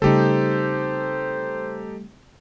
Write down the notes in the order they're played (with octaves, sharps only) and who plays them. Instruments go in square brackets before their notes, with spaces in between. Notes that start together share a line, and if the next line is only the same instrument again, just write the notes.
[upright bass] C#3 C4 [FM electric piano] G3 A3 [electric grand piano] D#4 G4 A4 [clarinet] C5